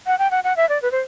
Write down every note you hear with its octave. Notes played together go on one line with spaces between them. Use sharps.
F#5
G5
F#5
F#5
E5
D5
B4
C5